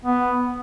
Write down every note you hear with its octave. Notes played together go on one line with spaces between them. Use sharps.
B3